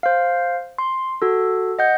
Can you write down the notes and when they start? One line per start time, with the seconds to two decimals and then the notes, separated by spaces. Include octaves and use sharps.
0.03 C5 F5
0.78 C6
1.22 F#4 A4
1.79 D#5 F#5 G6